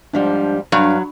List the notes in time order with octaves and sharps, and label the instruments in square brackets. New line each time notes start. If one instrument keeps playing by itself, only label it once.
[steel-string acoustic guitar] G#2 F3 G3 [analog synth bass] D4
[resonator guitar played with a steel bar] G2 [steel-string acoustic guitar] F#3 [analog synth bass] D4